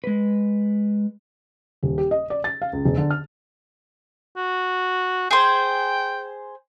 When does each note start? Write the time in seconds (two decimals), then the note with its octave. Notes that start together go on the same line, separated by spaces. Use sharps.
0.04 G#3 B4
1.83 D#1
1.98 G4
2.11 D#5
2.30 D5
2.44 A6
2.62 F5
2.73 C#2
2.85 E1
2.98 D3
3.11 F6
4.37 F#4
5.31 G#4 C5 G5